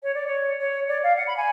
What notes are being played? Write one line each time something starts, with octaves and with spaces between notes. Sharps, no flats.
C#5
D5
C#5
C#5
D5
F5
F#5
B5
G#5